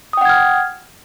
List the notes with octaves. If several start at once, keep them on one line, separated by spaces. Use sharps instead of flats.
F#5 G5 D#6 F6 G#6